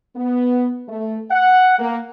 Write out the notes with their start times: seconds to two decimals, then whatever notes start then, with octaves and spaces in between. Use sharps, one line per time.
0.16 B3
0.88 A3
1.31 F#5
1.79 A#3